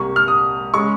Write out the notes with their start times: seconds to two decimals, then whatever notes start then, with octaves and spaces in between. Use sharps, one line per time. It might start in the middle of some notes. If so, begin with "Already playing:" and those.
Already playing: C2 C3 G3 A#3 C#6
0.16 F6
0.28 D#6
0.74 C#3 G#3 C#6